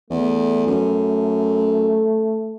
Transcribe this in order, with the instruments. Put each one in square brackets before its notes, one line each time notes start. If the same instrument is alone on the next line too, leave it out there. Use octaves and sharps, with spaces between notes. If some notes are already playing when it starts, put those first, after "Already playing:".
[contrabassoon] E2 [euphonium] A3
[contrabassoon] F#2